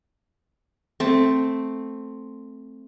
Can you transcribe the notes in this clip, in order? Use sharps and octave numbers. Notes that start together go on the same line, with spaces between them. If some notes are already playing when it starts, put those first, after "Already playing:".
A3 C4